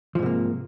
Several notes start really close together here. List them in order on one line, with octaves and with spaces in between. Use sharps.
F3 G#2 C3 A#3